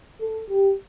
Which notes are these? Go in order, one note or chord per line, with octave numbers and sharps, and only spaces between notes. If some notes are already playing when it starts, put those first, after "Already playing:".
A4
G4